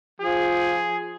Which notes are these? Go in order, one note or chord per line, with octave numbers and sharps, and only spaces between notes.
F3 G#4